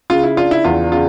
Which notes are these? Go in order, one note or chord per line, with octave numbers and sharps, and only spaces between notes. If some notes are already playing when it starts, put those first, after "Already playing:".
C#3 F4
E4
D4 F4
E4
E2 F4
C#3 F4